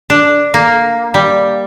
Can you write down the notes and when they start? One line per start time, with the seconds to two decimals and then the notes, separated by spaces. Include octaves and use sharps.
0.10 D4
0.54 A#3
1.14 G3